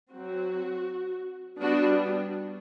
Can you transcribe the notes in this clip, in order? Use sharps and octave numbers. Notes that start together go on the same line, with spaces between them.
F#3 C4 F#4
G3 B3 D4 F#4